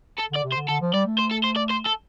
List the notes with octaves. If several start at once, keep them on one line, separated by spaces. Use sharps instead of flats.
A4
D3
D5
C3
C5
D3
D3 A4
F3
G3 D5
A3
C5
A4
C5
D5
C5
A4